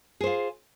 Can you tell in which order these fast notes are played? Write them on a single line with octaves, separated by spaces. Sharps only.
G#4 C5 F4